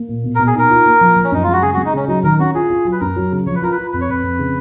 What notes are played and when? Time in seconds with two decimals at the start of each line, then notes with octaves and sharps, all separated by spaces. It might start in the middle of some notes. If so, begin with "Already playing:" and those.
Already playing: A#3
0.09 A#2
0.24 B2
0.35 A#4
0.39 B2
0.47 G#4
0.55 D#4 A#4
0.70 F4
0.86 A#3
1.01 F3
1.16 F3
1.24 C#4
1.32 F#2 D#4
1.43 G#3 F4
1.53 F#4
1.62 C#3 G#4
1.74 F#4
1.78 G#3
1.85 D#4
1.93 C#3 C#4
2.08 F#3 D#4
2.23 D#3 A#4
2.39 C#4 F#4
2.55 F4 G#4
2.70 F4
2.85 F#3
2.92 B4
3.00 F#2 A#4
3.16 F#3
3.32 C#3
3.47 F3 C#5
3.55 B4
3.62 F4 A#4
3.72 B4
3.78 F4
3.92 F2 B4
4.01 C#5
4.09 F2 B4
4.23 F2
4.39 C#3